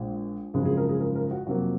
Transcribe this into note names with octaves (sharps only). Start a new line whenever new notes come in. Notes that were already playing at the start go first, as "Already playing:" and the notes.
Already playing: A#1 A#2 G#3
G#1 F#2 C#3 F3 G#3 G#4
G#4
A#4
G#4
A#4
A#4
F#4
F2 C3 F#3 A#3 F#4